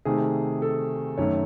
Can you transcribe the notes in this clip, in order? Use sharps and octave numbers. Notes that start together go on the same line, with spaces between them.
C3 D#3 A3 G#4
A4
F#2 D#3 A3 C#5